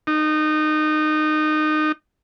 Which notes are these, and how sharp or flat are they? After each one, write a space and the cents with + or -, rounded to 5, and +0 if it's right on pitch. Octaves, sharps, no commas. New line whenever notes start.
D#4 -20